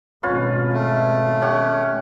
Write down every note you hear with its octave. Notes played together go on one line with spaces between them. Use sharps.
G#1 B2 C#4 F4 B4
A3
C#4 G4 F#5